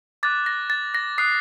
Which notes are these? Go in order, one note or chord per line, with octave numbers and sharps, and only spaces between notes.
D6 F#6 A6
A#6
A6
A#6
D#6 F#6 C7